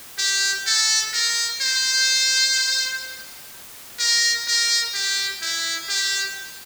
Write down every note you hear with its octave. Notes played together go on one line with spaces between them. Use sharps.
G4
A4
A#4
C5
A#4
A#4
G4
E4
G4